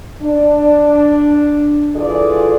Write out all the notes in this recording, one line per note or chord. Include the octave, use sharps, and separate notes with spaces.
D4
E3 F4 G#4 A4 D5